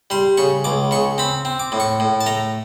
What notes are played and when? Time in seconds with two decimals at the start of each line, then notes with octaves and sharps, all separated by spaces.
0.10 G3 C6
0.37 C#3 C#6
0.64 C#2 D6
0.91 C#3 C#6
1.18 C4 B5
1.45 C4
1.60 D6
1.72 A2
1.80 C#6
2.00 A2
2.21 A5
2.26 A3 A#5